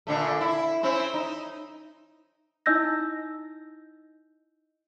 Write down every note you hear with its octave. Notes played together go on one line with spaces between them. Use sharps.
A#2 D3 A3
E4
C4 C#4 E4
D#4
D#4 E4 D#5 E6 G6 A#6